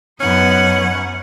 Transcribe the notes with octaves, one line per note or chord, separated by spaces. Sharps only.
F#2 B3 C#4 D#4 F#5